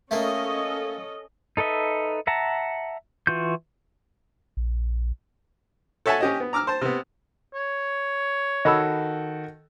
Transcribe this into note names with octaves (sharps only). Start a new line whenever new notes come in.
A3 A#3 C#4 A4 D#5
D#4 A4 B4 D#5 E5
E5 F#5 A5 A#5
E3 F4 F#4 G6
A#1
A4 C#5 E5 F#5 G#5 A5
C#4 G4 D#5
B3
A#5 D6 E6 F6
C5 A5
C3 B3
C#5
D#3 F#4 A4 D#5 B5 E6